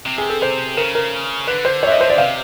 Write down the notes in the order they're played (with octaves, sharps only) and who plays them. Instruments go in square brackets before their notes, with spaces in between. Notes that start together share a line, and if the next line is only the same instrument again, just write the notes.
[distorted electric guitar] C3
[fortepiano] G#4
A4
C5
[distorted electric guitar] C#3 [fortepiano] A#4
[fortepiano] A#4
[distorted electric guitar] D3 [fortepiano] B4
[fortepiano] C5
C#5
E5
D#5
C5
D5
[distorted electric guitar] C3 [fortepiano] F5